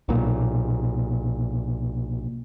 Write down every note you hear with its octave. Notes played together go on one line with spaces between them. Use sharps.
B1 A#2